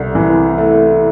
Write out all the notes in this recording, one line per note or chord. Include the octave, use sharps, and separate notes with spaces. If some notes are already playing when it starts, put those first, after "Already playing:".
Already playing: C2 A3
E3
A3